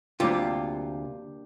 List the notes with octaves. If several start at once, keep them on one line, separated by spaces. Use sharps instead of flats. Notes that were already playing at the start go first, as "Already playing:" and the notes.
D2 C3 A#3 D4 F4 G4